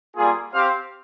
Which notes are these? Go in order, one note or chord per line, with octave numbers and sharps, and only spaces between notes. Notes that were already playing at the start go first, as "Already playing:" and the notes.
G3 A#3 F4 G#4
C4 G4 C5 F5